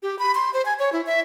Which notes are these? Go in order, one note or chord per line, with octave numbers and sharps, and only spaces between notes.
G4
B5
C6
C5
G#5
C#5
E4
E5